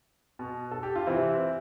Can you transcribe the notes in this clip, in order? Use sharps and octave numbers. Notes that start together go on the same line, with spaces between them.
B2
A4
G4
F4
C3 E3 C4 E4